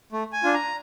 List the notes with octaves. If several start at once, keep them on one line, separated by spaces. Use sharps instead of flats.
A3
G#5
D4 F4
A#5